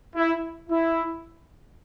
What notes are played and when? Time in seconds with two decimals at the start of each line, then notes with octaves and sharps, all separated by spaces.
0.16 E4
0.70 E4